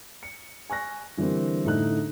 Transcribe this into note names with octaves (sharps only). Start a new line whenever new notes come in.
C#7
G#5 C#6 F#6 A#6
D3 E3 G3 A#3 C4
A2 D3 A3 D#4 F#6